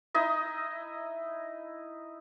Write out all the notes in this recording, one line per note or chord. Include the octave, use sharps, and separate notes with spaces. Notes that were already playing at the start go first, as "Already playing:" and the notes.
D#4 E4 D#5